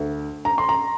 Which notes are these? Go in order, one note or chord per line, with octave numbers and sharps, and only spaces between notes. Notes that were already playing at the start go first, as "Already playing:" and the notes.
Already playing: D2
A#5
C6
A#5